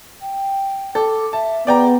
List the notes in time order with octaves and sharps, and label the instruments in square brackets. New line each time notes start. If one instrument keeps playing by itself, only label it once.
[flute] G5
[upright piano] A4 [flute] D6
[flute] E5 [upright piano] A5
[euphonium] B3 [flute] G#4 [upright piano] D5 G5 A#5